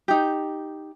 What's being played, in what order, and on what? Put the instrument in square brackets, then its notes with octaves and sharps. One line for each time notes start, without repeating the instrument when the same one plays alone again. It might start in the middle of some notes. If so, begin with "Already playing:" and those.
[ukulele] D#4 G4